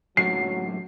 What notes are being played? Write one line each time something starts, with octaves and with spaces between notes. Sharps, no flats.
F#2 A2 F#3 C7